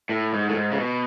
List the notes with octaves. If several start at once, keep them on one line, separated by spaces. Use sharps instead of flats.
A2
G#2
A2
G#2
C#3
B2